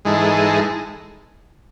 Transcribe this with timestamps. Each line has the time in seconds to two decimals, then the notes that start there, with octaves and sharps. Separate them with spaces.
0.05 G#2 E3 G#3 D#4 A4